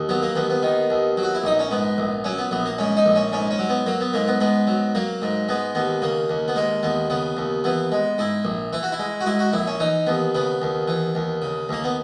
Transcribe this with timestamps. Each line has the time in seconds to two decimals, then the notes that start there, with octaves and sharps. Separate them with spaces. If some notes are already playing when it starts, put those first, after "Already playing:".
Already playing: D#2
0.09 F#3 B3
0.22 A#3
0.36 D#2 B3
0.50 B3
0.63 D#3
0.90 D#2
1.17 F#3
1.23 F#4
1.35 E4
1.44 A#1 D#4
1.59 C#4
1.71 G#2 B3
1.98 A#1
2.24 F#3 C#4
2.38 B3
2.51 A#1 B3
2.66 A#3
2.78 G#2 C#4
2.97 D#4
3.06 A#1
3.15 C#4
3.32 G#2 C#4
3.51 C#4
3.59 F#3
3.69 B3
3.86 F#3 A#3
4.01 B3
4.13 G#2 A#3
4.28 B3
4.40 G#2 B3
4.67 F#3
4.95 F#3 A#3
5.22 G#2
5.49 G#3 B3
5.75 D#2 B3
6.02 C#3 A#3
6.30 D#2
6.48 B3
6.56 G#3 A#3
6.83 D#2 B3
7.10 C#3 B3
7.37 D#2
7.64 E3 B3
7.92 G#3
8.18 G#2 E4
8.45 A#1
8.73 E3 E4
8.83 F#4
8.92 E4
8.99 G#3
9.21 F#4
9.26 G#2 E4
9.39 F#4
9.53 A#1 E4
9.67 C#4
9.80 E3 D#4
10.07 D#2 B3
10.35 C#3 B3
10.62 D#2
10.88 E3
11.15 D#2
11.42 C#3
11.69 D#2 A#3
11.84 B3